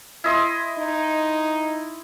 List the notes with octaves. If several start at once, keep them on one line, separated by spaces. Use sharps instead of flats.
E4 D#5 C6
D#4